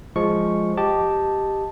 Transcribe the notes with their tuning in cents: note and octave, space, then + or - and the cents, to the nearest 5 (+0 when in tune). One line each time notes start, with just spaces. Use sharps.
F3 +0 G#3 +0 C#6 +0
G4 +0 D#5 +0 A5 +0